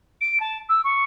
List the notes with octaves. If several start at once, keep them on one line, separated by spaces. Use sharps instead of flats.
D7
A5
E6
C#6